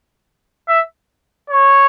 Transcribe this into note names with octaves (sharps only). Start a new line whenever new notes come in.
E5
C#5